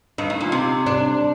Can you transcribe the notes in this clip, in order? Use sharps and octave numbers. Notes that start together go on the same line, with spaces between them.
G2 D#4
A2
A#2
C3
D4